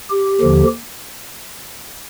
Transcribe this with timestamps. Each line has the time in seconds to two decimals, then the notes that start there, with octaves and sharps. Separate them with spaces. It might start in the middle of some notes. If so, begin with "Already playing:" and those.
0.10 G4
0.41 D#2 D3 F3